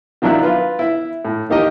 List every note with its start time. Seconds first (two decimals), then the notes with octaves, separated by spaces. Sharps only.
0.22 D#3 F3 F#3 D4 E4 F#6
0.43 F4 B4
0.79 E4 E5
1.25 A2
1.50 D#3 A#3 D#4 G4 A#4 D#5